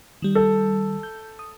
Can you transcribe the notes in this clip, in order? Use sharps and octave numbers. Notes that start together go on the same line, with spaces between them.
D#3 G3
A4
G6
D#6